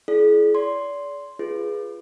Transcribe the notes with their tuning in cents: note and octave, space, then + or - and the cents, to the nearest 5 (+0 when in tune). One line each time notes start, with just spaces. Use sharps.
E4 +30 G#4 +35 D5 +0
D5 -35 C6 +0
F4 -15 G#4 +0 B4 -5